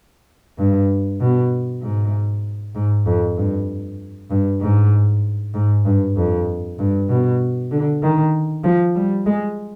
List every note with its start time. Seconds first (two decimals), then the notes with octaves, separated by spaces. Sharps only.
0.58 G2
1.20 B2
1.82 G#2
2.75 G#2
3.06 F2
3.37 G2
4.30 G2
4.61 G#2
5.54 G#2
5.85 G2
6.17 F2
6.79 G2
7.09 B2
7.72 D3
8.02 D#3
8.64 F3
8.96 G3
9.26 G#3